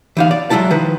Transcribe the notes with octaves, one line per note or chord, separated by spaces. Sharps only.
E3 D#4 F5
D5
F#3 G#3 A3 E4 A5
D#3 F3 B4